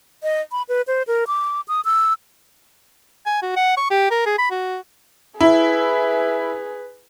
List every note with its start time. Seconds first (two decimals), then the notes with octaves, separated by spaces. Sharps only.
0.23 D#5
0.52 B5
0.69 B4
0.87 C5
1.07 A#4
1.27 D6
1.68 D#6
1.85 E6
3.26 G#5
3.43 F#4
3.56 F#5
3.77 C#6
3.90 G4
4.11 A#4
4.26 G#4
4.38 B5
4.51 F#4
5.41 E4 G#4 B4